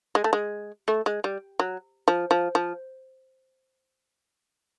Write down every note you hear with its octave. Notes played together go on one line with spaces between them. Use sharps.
G#3
A3
G#3
A3
G#3
G3
F#3
F3
F3
F3